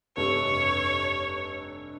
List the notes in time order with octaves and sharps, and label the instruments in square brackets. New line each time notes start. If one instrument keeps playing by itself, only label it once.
[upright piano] F1 G2 A4 [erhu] C#5